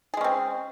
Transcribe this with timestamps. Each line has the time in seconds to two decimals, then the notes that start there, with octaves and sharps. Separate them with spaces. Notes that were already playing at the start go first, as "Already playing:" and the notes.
0.14 G#4
0.17 G#3
0.21 C#4
0.24 C4